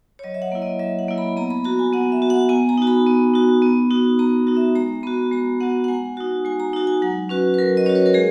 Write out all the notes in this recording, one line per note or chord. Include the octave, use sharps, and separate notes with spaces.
C#5
F#3 D#5
E5
F#5
A#3 E4
D#5
F#3 E5
F#5
A#3 E4
B5
B3 A#5
B5
F#4 A#5
G#5
B3 F#5
E5
F#4
F#5
B3 G#5
A#5
D#4 F#4
B5
B3
D#4 F#4
B3
D#4 F#4
B3 A#5
D#4 F#4
E5
G#3 A#5
B3 F#4 B5
G#3 A#5
B3 F#4 F#5
F#5
G#3 G#5
D#4 F#4
G#3 G#5
A#5
D#4 F#4
G#5
F#3 F#5
C#4 F#4 B4
B4
F#3 A#4
D#5
C#4 F#4 C#5
B4
A#4
G#3 G#4